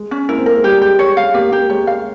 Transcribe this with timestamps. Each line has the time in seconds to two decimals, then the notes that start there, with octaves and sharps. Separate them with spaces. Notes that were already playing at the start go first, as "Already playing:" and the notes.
Already playing: G#3
0.11 C#4
0.29 A#3 E4
0.38 C4
0.46 A#3 A#4
0.55 G#3
0.64 G3 G4
0.81 G#3 G4
0.99 C#5
1.17 F5
1.23 G#3
1.34 A#3 G4
1.52 A#3 G4
1.70 G#3 C#5
1.87 F5